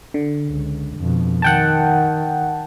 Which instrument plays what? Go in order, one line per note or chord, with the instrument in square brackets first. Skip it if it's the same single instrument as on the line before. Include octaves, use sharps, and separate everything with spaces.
[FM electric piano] D3
[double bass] C#2
F2 B2
[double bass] D#3 [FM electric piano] F#5 G5 A5